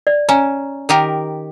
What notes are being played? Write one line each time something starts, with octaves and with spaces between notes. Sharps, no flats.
D5
C#4 G#5 A#5
D#3 G4 A#4